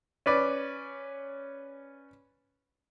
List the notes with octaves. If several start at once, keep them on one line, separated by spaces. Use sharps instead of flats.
C#4 B4 D5